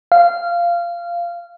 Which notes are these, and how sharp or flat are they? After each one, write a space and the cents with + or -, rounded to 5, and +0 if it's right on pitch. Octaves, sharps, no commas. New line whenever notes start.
F5 -15